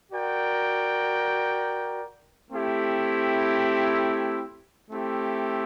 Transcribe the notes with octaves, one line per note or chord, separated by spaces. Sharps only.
F#4 A#4 D5 G5
A3 C4 E4 G4
A3 C4 E4 G4